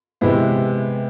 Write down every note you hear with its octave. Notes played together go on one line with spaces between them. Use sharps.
C3 E3 G#3 B3 E4